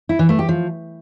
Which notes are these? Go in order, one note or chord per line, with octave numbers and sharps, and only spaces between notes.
E4
E3
A3
G4
F3